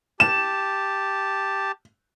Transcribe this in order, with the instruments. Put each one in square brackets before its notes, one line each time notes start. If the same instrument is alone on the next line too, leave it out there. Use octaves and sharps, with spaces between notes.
[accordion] G4 A5 [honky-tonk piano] E7